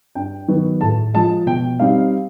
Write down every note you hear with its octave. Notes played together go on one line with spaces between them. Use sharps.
G2 G5
D#3 F#3 B3
A2 A5
F3 G#3 A5
B2 G5
G3 C4 D#4 F5